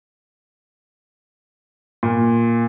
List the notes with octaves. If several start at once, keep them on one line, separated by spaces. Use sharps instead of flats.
A#2